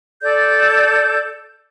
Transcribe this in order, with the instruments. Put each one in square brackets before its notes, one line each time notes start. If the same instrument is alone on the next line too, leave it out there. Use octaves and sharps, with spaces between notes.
[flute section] A4 D5 G6